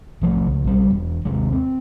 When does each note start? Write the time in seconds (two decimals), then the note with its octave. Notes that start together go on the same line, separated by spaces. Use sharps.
0.22 B1 F3 A3
0.47 C#2
0.64 B1 G3
0.90 E1
1.25 D#2 C3 G#3
1.52 C4